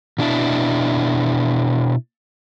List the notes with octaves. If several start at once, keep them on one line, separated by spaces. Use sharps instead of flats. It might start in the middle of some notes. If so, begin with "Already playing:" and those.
B2 D4 E4